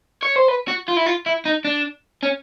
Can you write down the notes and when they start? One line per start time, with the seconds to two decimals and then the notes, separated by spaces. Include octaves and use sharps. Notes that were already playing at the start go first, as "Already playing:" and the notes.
0.23 C#5
0.36 C5
0.48 B4
0.68 F#4
0.88 F4
0.96 E4
1.06 F4
1.26 E4
1.46 D#4
1.65 D4
2.23 C#4